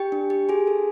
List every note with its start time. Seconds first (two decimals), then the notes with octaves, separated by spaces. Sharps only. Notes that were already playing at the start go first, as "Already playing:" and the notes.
Already playing: G4 G5
0.12 D4
0.30 G4
0.49 F#4 G#4 G#5
0.67 A4